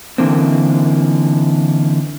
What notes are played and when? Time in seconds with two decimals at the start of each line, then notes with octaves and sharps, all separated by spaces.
0.18 D3 E3 A#3 C4